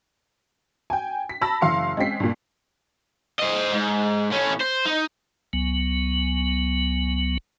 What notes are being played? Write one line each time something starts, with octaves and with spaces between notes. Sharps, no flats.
G5 G#5
B6
A5 B5 E6 A#6
F#1 E3 F5 C6 C#7
G#3 C4 C#4 G5 B6 C7
G2 A#2
C5 D#5
G#2
A2 C#4
C5
D#4
C#2 F#3 B3